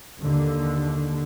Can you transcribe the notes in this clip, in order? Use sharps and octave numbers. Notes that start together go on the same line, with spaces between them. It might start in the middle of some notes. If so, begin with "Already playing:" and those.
D#2 D3